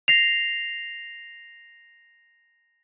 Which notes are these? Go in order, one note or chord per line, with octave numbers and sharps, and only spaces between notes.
A#6 C7 F7